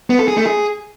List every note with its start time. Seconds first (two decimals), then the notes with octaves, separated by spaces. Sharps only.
0.10 B3
0.19 A4
0.28 G#4
0.37 A3
0.46 G#4